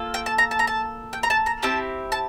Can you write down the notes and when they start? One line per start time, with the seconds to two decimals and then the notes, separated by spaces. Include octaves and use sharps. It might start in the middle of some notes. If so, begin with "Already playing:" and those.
Already playing: A#3 F4 A4
0.14 G5
0.26 A5
0.38 A#5
0.51 A5
0.59 A#5
0.67 A5
1.13 G5
1.23 A#5
1.30 A5
1.46 A#5
1.63 C4 E4 G4 A5
2.12 A5